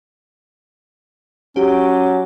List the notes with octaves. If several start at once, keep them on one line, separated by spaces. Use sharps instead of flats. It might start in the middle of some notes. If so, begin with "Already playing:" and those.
F#3 C#4 G4